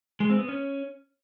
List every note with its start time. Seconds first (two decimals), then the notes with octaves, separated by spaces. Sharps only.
0.20 G#3
0.30 C4
0.39 B3
0.48 C#4